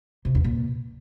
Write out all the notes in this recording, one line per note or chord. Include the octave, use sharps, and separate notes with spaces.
C3
E2
A#2